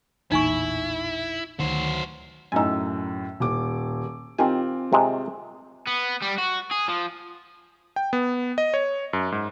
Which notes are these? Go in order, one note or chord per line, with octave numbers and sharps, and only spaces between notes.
A1 E2 A#2 D#4 E4 G#5 C#6
D2 D#3 F#3 C5
F#2 A2 D#4 G#5 E6
D#1 D6
D#3 C4 F4 G4 G#5
C3 G#3
B3
G3
F#4
G#4
F3
G5
B3
D#5
C#5
F#2
G#2